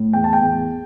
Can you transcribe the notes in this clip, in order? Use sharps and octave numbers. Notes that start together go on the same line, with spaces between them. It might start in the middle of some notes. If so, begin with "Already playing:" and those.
Already playing: A2
E2 G5
A5
G5
E2